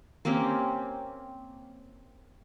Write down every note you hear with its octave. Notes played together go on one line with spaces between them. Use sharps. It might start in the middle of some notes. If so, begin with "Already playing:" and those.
A#3 C4 C#4 G4